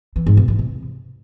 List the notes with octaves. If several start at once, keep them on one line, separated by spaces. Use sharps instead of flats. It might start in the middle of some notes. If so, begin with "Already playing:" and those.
E3
G#2
B2
E3
C3